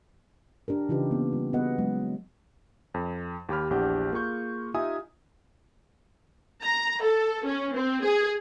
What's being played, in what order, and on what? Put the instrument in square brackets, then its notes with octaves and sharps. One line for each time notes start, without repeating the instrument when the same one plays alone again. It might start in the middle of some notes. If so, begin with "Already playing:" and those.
[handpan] D4 G4 A#4
C#3 E3 D#4 F4 G4 B4
A#3 B3
G3 F4
B3 F#4 G#4 B4 D#5 F#5
F#3 G#3
[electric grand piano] F2
D#2 G4 B5 F6
A#1 E2 D4 G4 F#5 G6
A#3 F4 G#4 C#6 G6
D#4 F4 G4 E5 G#5 D#6
[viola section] A#5
A4
C#4
C4
G#4